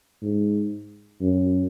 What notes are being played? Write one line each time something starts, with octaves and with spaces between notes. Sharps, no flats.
G#2
F#2